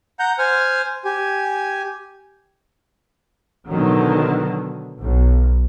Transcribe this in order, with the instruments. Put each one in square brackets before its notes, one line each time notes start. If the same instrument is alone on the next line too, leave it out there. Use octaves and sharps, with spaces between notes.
[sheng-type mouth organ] F#5 A#5 G6
C5 G#5 F6
G4 G#5
[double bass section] B2 D3 D#3 F#3
B1